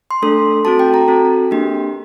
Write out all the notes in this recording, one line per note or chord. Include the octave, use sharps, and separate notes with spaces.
C6
A3 D4 A4
C4 F#4 A4 A5
G5
A#5
C4 F#4 A4
A#3 D4 G4